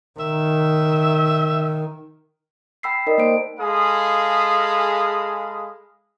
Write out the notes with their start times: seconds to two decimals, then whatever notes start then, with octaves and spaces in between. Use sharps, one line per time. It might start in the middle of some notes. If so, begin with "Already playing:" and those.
0.20 D#3 E5
2.83 G5 B5 E6 B6 C7
3.07 D#4 A#4 D5 D#5
3.18 A#3 C5 G5 D7
3.60 G#3 G#4 A4 F5 B5 D#6